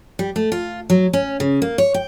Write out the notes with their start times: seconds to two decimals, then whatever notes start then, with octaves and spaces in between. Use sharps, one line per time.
0.19 G3
0.36 A3
0.52 F4
0.90 F#3
1.13 C#4
1.40 C#3
1.62 A#3
1.78 C#5
1.94 G5